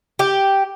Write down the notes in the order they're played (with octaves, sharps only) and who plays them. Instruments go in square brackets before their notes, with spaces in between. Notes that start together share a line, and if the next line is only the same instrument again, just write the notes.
[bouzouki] G4